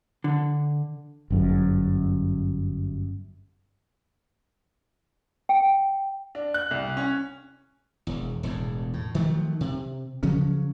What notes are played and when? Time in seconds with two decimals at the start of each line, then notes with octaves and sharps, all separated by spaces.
0.24 D3
1.30 G1 F#2
5.49 G5
6.35 D4
6.54 F#6
6.71 C2
6.97 C#4
8.07 E1 E2
8.43 E1 E2 A2
8.94 A2
9.15 D#3 F3 F#3 A3
9.61 C3
10.23 C#3 F3 F#3 C#4